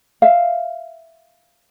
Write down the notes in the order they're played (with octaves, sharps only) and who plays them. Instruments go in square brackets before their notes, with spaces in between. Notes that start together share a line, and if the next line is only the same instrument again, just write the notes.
[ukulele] E5 F5